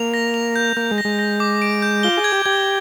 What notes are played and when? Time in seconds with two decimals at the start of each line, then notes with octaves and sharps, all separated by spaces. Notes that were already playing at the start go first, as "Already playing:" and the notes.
Already playing: A#3 F7
0.14 A#6
0.34 F7
0.56 G6
0.77 A#3 G6
0.91 G#3
0.98 A#6
1.05 G#3
1.19 A#6
1.40 D6
1.62 D7
1.82 G6
2.03 F4 G7
2.17 G#4
2.24 G#6
2.32 G4
2.46 G4 G#6